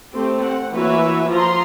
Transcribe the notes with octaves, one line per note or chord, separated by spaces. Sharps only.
A3 C4 G4
F#5
E3 A#3 F#4 B4 C#5 E5
F3 F4 A#5 C6